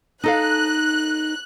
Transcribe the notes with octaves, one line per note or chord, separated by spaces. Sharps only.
D#4 A4 F5 F#6